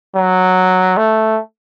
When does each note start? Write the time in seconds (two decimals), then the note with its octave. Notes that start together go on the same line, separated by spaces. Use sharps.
0.16 F#3
0.97 A3